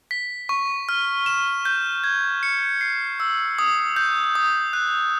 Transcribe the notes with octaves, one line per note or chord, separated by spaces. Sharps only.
B6
C#6
F6
E7
G6
G#6
C#7
C7
E6
D#6
G6
D#6
F#6